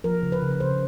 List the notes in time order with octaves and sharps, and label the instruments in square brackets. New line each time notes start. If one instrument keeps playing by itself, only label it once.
[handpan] F3 A#4
C#3
B4
C#3
C#3 C5